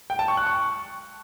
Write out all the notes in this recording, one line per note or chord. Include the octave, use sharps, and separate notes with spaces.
G5
A5
C#6
F#6
C#6